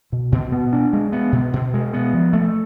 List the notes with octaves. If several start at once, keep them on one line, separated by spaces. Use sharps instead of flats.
B2
B2
B3
D4
G#3
B3
B2
B2
G#3
B3
F3
A3